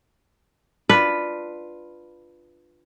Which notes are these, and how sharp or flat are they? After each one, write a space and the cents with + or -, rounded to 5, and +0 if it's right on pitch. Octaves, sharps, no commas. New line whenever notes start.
D4 +15 F4 +0 B4 +0